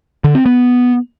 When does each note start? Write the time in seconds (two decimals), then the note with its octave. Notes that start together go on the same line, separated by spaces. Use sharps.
0.24 D3
0.35 C4
0.46 B3